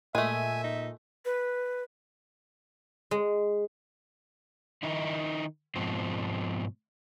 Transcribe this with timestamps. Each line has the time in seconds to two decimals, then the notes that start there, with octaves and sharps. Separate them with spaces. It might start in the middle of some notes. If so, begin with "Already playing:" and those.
0.15 A#2 G#3 A3 E5 G#5
0.64 D#4
1.25 B4
3.11 G#3
4.83 D#3 D#4 E4
5.76 G#2 B2 F3 C4